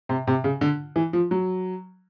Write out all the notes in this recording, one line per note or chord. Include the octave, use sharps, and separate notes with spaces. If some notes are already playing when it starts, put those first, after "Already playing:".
C3
C3
C#3
D3
E3
F3
F#3